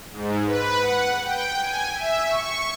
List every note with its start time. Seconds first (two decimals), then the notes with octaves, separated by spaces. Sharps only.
0.12 G#2
0.46 B4
0.79 F#5
1.22 G5
1.62 G#5
1.95 E5
2.26 C#6